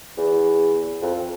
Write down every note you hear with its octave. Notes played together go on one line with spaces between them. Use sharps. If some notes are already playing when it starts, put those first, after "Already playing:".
E2
F2